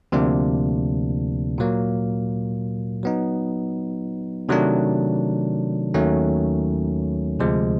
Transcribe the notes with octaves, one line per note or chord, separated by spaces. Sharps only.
D2 C3 F3 A#3 D4
A#2 F#3 A#3
F#3 B3 D#4
C3 D#3 F#3 A3 D4
D#2 D#3 F#3 A3 C#4
D2 C3 F3 G#3